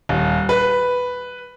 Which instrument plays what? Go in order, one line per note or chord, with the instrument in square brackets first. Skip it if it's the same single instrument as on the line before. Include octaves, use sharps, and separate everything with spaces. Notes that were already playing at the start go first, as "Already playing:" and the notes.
[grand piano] D#1
B4